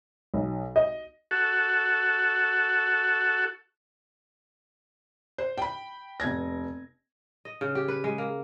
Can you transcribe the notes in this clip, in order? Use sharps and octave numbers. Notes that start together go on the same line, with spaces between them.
B1
D#5
F#4 A4
C5
G5 B5
F1 B3 G#6 A#6
D#5
C#3
G4
B4
G#3
A#3